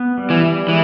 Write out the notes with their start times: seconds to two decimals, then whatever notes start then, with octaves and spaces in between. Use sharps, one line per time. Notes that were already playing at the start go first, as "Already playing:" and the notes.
Already playing: B3
0.18 G3
0.30 E3
0.43 G3
0.68 E3 G#3